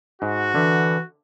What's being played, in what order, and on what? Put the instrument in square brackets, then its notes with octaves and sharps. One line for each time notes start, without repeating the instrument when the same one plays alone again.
[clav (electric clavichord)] G#2 [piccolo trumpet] F#4
[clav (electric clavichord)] D3 E5 [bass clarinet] E3